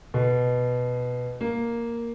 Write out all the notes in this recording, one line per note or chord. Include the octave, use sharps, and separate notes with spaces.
B2
A#3